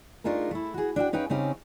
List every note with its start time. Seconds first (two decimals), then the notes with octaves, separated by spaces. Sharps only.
0.24 A3 D4 D#4 F4 G#4 A#4
0.51 A3 E4
0.74 F#4 G#4
0.96 D4 F#4 E5 G5
1.13 C#4 D#4 B4 F5 G5
1.30 C#3 C4 C#4 D#4 G4